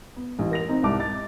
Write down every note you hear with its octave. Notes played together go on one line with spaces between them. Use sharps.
B3
A1
A#4 A#6 F7
C4 D#4
C2 G#2 A5 D6
D#5 A6